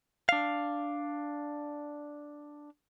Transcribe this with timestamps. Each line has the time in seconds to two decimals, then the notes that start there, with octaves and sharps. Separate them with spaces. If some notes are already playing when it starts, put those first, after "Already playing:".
0.29 D4 F5